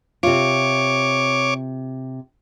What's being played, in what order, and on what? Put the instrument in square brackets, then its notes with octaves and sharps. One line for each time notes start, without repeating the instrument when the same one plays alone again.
[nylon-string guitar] C3 F4 [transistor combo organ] C#5 D6